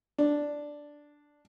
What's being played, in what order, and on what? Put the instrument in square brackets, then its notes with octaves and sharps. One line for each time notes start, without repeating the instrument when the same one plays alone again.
[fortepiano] D4